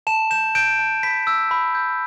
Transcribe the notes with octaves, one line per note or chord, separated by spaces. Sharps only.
A5 E7
G6 E7
G6 D7
A5
B5 B6
E6
B5
G6